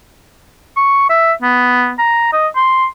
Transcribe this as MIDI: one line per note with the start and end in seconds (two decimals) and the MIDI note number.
0.76 1.07 85
1.09 1.32 76
1.42 1.93 59
1.99 2.30 82
2.33 2.48 75
2.56 2.86 84